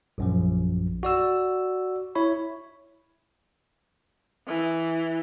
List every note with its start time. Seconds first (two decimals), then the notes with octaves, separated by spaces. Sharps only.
0.18 A#1 F#2 F3
1.03 F#4 D5 E6
2.15 E4 C#5 B5
4.47 E3